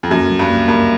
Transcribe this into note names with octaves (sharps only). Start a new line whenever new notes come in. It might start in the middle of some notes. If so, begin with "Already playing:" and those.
F2
F#2 A#3
F#3
G2
A#3
G2 A#3